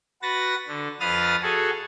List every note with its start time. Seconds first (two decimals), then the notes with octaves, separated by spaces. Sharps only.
0.22 F#4 B4 A6 A#6
0.68 D3
1.00 F2 B4 F5 D#6 F6 A6
1.42 F#4 G#4 A4